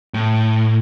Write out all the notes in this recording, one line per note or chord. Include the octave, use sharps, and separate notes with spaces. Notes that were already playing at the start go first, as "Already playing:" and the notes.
A2